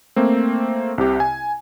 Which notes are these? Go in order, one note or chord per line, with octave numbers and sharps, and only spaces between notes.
A3 A#3 C4
C2 C3 G4
G#5